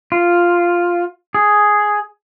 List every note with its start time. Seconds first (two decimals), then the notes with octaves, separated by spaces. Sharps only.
0.12 F4
1.34 G#4